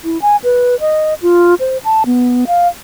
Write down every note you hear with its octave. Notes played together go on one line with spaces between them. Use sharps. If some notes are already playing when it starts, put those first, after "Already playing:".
E4
G#5
B4
D#5
F4
C5
A5
B3
F5